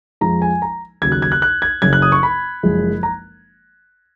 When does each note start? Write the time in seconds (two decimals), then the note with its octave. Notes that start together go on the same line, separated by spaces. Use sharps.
0.21 F2 F3 G#3 A#5
0.42 G#5
0.62 A#5
1.02 D#2 C#3 F#3 G#6
1.12 F#6
1.22 G#6
1.32 F#6
1.42 F#6
1.62 G#6
1.82 F#1 F#2 C#3 G#6
1.93 F#6
2.02 D#6
2.12 C#6
2.23 B5
2.63 F#1 F#2 F3 G#3
3.03 A#5